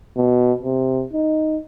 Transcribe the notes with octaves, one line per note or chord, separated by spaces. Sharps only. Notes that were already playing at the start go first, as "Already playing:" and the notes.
B2
C3
D#4